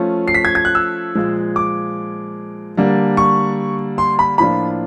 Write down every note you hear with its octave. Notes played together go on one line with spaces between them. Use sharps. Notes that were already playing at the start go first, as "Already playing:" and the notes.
Already playing: F3 A3 C#4 F4
C7
B6
G#6
G#6
F#6
E6
A#2 F3 G#3
D6
D3 G3 A#3 D4
C#6
C6
B5
A2 F3 A#3 D4 F4 B5